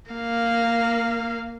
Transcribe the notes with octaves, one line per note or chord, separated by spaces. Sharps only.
A#3 F5